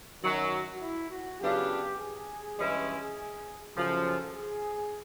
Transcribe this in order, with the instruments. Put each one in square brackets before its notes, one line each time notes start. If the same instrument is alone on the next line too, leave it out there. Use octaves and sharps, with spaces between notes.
[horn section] F#2 D#3 F#3 [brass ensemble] F#4
[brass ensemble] E4
F#4
[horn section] C#3 F#3 B3 D4 F4 [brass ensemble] G4
[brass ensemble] G#4
[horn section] G2 E3 G#3 C#4 E4
[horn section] F#2 C#3 F3 [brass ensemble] A4
[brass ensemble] G#4